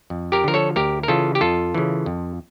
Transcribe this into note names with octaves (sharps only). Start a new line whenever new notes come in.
F2
G4 A#4
D3 F3 A#4
A4 C#5
D2 G4 A#4
A#4
C#3 E3 F4 A4
G4
F2 F4 A4
C#3 E3
F2